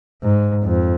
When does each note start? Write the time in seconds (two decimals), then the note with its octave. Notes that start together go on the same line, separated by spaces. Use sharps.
0.23 G#2
0.65 F2